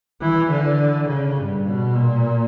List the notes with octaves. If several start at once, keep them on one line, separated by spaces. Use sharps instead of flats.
E3
D3
C#3
G2
B2
A#2